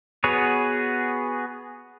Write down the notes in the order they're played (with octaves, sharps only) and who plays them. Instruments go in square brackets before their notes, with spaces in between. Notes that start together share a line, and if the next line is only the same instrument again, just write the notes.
[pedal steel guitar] B3 F#4 G#4 B4 C#5